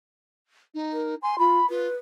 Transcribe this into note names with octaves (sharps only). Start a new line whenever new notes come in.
D#4
A#4
G#5 C6
F4 B5
F4 B4